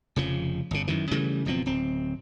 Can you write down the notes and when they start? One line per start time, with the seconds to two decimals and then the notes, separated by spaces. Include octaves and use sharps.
0.16 F1 C#3 F3
0.71 G1 C#3
0.88 F#2 D#3 E3
1.11 C#3 E3 G3 A3
1.46 F#1 B2 F3 C4
1.66 D1 C4